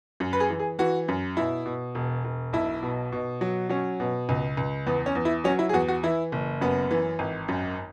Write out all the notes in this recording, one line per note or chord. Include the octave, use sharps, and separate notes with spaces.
F#2
B4
G#4
E3
G#4
E3 F#4
F#2
B2 E4
B2
E1
E1
B1 E4
B2
B2
F#3
F#3 C#4
B2
C#2
C#2
E2 B3
C#4
E2
E4
F#3 C#4
E4
G#4
E2 F#4
F#4
E3 E4
F#1
F#2 B3
E3
G#1
F#2